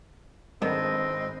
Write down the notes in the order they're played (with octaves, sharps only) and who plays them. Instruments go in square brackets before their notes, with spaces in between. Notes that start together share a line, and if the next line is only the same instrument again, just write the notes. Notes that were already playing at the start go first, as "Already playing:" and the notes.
[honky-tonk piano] G#1 [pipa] D3 D#3 B3 [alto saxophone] C4 [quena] D#5